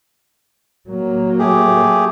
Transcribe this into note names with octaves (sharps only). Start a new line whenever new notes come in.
F#3 A#3
A3 G4 G#4